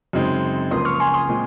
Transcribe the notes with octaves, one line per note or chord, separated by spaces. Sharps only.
F#2 C#3 G#3 C4 D#4
C#2 C#3 F3 A#3 C6 D#6
C#6 F6
G#5 C6
C6 D#6
A#2 G#3 C4